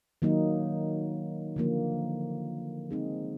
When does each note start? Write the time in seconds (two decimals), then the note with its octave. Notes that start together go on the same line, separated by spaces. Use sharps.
0.22 D#3 F#3 A#3 D#4
1.56 D3 F3 A#3
2.91 G#3 C4 D#4 G#4